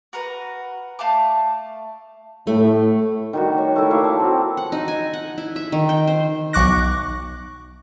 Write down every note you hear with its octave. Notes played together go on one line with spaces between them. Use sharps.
F#4 A#4 B4
A3 F5 A5 D6
A2 A3
D#3 G3 F#4
C#5
A3 E4
A#3 E4 C#5 F5
A5
C4 F#4
F#5
D#4
G#5
F#5
E4
E5
D#3
G5
C5
B1 C#6 D6 F#6 A#6